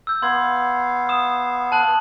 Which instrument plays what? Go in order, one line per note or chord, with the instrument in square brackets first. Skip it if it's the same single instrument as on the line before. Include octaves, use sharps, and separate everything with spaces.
[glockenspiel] E6 G6
[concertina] B3 F5 [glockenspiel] C6 G#6
[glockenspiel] D#6 E7
A5 F#6 F#7